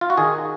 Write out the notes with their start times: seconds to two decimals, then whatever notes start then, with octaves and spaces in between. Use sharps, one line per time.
0.01 F4
0.10 F#4
0.17 D#3 G#4